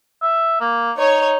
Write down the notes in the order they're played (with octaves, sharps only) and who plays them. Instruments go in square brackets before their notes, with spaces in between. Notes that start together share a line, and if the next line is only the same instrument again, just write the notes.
[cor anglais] E5
A#3
[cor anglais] D#4 [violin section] C#5